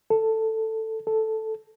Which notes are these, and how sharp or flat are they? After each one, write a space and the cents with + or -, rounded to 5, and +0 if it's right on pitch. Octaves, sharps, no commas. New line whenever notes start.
A4 +10
A4 +0